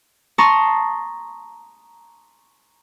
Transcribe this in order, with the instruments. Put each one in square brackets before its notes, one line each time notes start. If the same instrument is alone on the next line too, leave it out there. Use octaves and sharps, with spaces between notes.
[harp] A5 A#5 C6 C#6 D#6